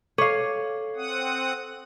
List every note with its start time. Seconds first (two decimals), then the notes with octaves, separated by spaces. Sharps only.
0.18 A4 C#5 F5
0.96 C4 F#5 D#6